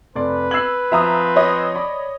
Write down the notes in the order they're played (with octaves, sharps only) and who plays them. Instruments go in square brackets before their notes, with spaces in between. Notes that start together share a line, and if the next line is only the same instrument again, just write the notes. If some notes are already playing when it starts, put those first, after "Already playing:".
[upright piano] F1 D5 C6 [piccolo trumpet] B4
[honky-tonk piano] E6 F#7 [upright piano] G#6 C7
[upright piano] F3 [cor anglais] C4 [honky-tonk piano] E5 A#5 D#6
[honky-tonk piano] C#5 D#5
[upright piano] D5 B5 D6